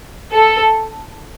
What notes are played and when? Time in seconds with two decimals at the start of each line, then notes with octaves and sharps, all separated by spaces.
0.33 A4